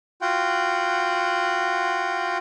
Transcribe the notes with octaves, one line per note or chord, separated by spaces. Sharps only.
F4 F#4 F#5 G5